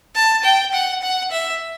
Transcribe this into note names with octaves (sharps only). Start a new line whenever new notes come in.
A5
G5
F#5
F#5
E5